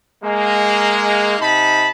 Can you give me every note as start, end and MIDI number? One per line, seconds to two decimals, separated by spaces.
0.23 1.36 56
0.23 1.36 58
1.39 1.87 48
1.39 1.87 63
1.39 1.87 81
1.39 1.87 83